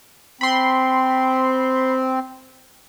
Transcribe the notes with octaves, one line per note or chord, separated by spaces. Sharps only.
C4 B5 C6